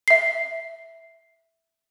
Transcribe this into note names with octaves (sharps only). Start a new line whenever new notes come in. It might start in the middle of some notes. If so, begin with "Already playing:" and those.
E5 C7